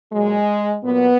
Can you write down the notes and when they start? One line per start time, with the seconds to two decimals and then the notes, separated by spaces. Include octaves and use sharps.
0.12 A#2 F#3 G#3
0.84 A#2 F#3 B3